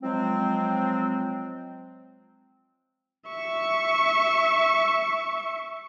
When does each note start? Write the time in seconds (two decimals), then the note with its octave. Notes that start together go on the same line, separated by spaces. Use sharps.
0.02 F3 F#3 G#3 C4
3.28 E5 C#6